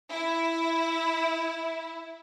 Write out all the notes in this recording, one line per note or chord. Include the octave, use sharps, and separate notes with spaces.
E4